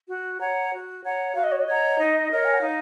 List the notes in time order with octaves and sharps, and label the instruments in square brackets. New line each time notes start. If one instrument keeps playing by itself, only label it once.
[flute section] F#4
C#5 F#5 A#5
F#4
C#5 F#5 A#5
[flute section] F#4 [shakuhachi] F5
[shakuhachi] D#5
C#5
D#5
[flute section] C#5 F#5 A#5
D#4
A#4 C#5
[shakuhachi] G#5
F#5
[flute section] D#4 [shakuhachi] F5